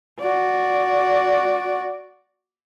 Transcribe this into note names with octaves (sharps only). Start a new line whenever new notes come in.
F#4 D5